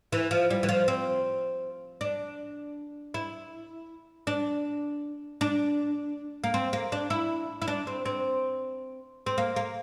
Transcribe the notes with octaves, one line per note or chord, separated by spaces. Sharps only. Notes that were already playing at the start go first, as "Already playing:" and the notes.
E3
F3
G3
E3
F3
C4
D4
E4
D4
D4
A#3
C4
A#3
D4
E4
E4
D4
C4
C4
C4
A#3
A#3